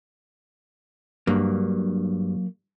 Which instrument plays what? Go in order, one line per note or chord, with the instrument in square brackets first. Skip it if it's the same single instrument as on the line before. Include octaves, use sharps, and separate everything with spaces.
[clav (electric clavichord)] G2 [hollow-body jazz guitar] F#3 A#3